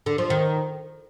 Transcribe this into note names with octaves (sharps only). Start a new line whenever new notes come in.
D3
F3
D#3